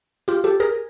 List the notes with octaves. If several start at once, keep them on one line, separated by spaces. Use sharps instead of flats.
F4 G4
G4 A4
G#4 A#4